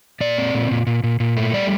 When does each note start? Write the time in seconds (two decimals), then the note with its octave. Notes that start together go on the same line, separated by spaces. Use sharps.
0.20 A#2 D5
0.38 C4
0.54 A#2
0.71 A#2
0.87 A#2
1.03 A#2
1.20 A#2
1.37 A3
1.53 G3 D5